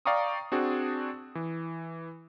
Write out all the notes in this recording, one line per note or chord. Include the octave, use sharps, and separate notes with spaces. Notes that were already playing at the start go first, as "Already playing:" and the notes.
D5 F5 G5 A#5 C#6 D#6
C4 D4 F#4 G#4
E3